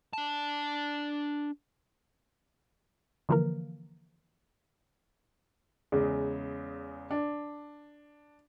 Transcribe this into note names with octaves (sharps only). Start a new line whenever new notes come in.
D4 A5
D3 E3 F3 A#3 A#4
E2 C#3 G#3
D4